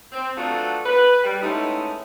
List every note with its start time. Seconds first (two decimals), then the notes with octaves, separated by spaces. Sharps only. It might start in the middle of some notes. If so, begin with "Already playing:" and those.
0.12 C4
0.36 F#3 A3 B3 D4 F4 F#4
0.85 B4
1.24 G3
1.42 G#2 A3 B3 C#4 D#4 E4